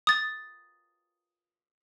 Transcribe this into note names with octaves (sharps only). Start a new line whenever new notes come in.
D#6 A6